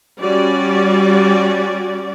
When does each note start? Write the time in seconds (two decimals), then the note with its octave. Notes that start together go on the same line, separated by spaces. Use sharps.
0.19 G3 C#4 F#4 D5